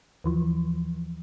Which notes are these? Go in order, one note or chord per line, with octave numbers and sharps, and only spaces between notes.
D#2 E3 F3